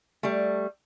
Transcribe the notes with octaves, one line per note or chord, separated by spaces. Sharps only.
G3 A3